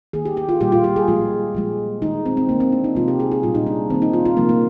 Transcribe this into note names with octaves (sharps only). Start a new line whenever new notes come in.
D#3 A#3 G#4
G4
G4
F4
A#2 G3 A#3 G4
F4
G4
G#4
A#2 F3 G#3 F4
A#2 F3 G#3
D#3 G#3 D#4
C4
C4
D3 G#3 A#3
C4
D4
D#4
C3 F3 G#3 F4
G4
G#4
G#4
A#2 G3 A#3 F4
D#4
D4
D#3 A#3 C4
D#4
F4
F4
C3 F3 G#3 A#3
A#3